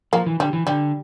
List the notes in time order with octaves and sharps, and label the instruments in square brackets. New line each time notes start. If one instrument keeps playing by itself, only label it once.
[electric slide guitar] F3 [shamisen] A#3
[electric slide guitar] E3
[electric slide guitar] D3 [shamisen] G3
[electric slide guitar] E3
[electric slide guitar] D3 [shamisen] G3